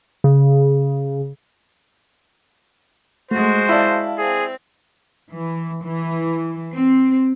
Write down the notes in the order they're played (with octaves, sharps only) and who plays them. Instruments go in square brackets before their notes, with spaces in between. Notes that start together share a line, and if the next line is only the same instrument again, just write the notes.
[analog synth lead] C#3
[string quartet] G#3 F#4 [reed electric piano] A3 [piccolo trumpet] C5
[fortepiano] E4 D5 [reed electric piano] F5 A5
[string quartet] C4 [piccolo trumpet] G#4
[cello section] E3
E3
C4